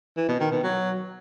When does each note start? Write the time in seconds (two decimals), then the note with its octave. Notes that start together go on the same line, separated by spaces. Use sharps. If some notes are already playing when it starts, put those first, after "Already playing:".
0.17 E3
0.28 B2
0.40 D#3
0.52 B2
0.64 F#3